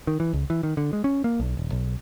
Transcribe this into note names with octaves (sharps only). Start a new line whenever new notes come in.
D#3
E3
C#2
E3
D#3
D3
G#3
C#4
A#3
B1
D#1
B1